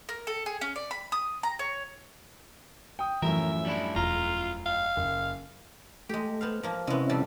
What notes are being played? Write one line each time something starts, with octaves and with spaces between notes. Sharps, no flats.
A#4
A4
G#4
C#4
D5
B5
D#6
A#5
C#5
G5 D#6
F#2 A2 E3 F3 A#4 E5
G3 D4 E4
E1 F4 A#5
F5
F#1
G#3 A3 G4
B3 C5 F5
F3 A#3
C3 G#3 B3 C#4 E4
F2 G3 A5